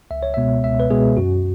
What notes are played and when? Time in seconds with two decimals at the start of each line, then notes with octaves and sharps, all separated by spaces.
0.11 C#2 E5
0.23 C#5
0.34 B2 G#3 B3 E5
0.64 C#2 E5
0.80 B4
0.90 B2 G#3 B3 G#4
1.17 F#2 F#4